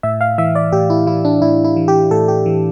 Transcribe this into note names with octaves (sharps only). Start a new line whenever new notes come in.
A2 E5
F5
E3 E5
D5
A2 G4
E4
E3 E4
D4
A2 E4
E4
E3
G4
A2 A4
G4
E3